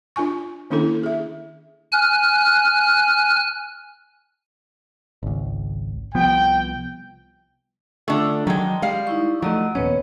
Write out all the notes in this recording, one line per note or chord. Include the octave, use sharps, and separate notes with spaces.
D4 F4 G#5 C#6
D#3 A#3 C#4 D4 E4 A4
G#4 E5
G#5 F6 F#6
G#1 C#2
C2 F3 B3 G5
D3 A3 D4 F4
D#3 F#3 G#3 A5
G3 G#3 F5
D#4 E4 C#6
F3 F#3 A3 D5 D#5
D#2 A#2 B3 C#4 B4 C#5